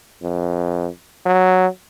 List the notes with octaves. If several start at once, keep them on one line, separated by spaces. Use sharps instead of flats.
F2
F#3